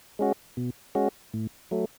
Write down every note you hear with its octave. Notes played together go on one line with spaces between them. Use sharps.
G#3 C#4 F#4
B2
G#3 C#4 F#4
A2
F#3 A3